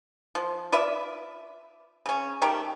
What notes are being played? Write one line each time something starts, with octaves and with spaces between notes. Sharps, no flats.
F3
F4 B4 D5 E5
C#3 C#4
D#3 A3 G4 A#4